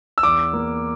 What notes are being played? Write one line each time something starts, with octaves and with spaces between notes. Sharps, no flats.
E6
E2 D6
A#3